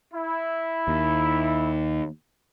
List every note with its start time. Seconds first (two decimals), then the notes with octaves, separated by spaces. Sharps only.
0.14 E4
0.88 D#2